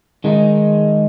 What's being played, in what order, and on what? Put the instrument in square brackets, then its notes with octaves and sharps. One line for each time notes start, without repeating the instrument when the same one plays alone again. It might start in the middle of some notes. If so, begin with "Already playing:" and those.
[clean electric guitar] D#3 G#3 D#4